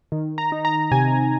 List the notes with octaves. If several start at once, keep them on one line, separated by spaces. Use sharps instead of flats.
D#3
A#5
D#4
A#5
C3 G#5